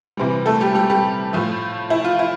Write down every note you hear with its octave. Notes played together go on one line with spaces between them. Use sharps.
C3 E3 G3
A3 A4
G3 G4
G3 G4
G3 G4
A2 F3 A3
E4
F4
E4